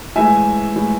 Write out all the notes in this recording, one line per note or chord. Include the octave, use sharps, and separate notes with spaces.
A2 E3 G#3 E5 G#5
A2 E3 G#3